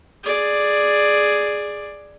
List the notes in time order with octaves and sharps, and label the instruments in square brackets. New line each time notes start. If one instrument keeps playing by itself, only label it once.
[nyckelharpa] G#4 D5